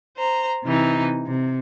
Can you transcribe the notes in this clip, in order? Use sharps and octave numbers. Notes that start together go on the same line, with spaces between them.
C5 A#5
C3 E3 D#4
C3